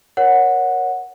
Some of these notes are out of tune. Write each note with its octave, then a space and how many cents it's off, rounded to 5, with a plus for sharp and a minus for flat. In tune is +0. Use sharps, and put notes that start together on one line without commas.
A#4 +30 C#5 +0 F#5 -10